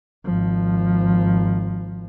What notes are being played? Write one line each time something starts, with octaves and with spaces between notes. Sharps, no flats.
G#1 F3